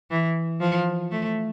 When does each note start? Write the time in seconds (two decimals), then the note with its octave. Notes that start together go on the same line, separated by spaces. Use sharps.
0.11 E3
0.61 F3
1.11 A3